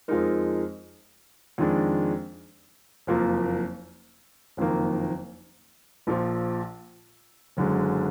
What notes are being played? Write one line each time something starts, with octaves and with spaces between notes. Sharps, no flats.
F2 F3 G#3 D#4 A#4
F2 D#3 G#3 D4
F#1 F2 F3 A#3
F#1 F2 D#3 A#3
A#1 A#2 F3
F#1 F#2 D3 G#3